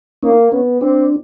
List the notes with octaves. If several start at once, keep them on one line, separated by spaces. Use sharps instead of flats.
A#3 C#4 D#4
B3 C#4
C4 D4